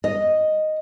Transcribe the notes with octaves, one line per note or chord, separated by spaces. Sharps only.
D#5